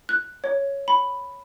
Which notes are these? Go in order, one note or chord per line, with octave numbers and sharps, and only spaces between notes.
F#6
C#5
B5